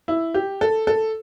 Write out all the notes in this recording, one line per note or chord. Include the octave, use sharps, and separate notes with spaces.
E4
G4
A4
A4